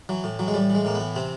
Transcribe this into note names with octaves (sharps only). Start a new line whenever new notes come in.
E3 F#3
A2
E3 F#3
G#3
A2 G3
E3
G#3
A2 A#3
B3
E3
C3 C4